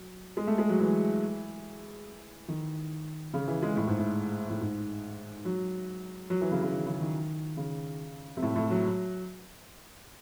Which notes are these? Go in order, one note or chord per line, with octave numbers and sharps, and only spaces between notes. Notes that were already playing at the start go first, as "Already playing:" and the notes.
Already playing: F#3
G#3
A3
G#3
F#3
E3
D#3
C#3
E3
G#3
A2
G#2
A2
A2
G#2
F#3
F#3
E3
C#3
C#3
D#3
C#3
D#3
C#3
C3
A2
A2
F#3